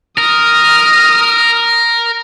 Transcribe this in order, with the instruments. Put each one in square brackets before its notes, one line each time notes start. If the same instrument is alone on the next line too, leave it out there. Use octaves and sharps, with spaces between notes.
[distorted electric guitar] A#4 [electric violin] D#6 F6